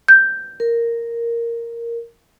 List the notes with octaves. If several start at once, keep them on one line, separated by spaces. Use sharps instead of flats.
G6
A#4